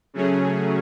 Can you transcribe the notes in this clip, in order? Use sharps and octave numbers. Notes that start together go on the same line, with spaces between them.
C#3 F#3 A3 C#4 G#4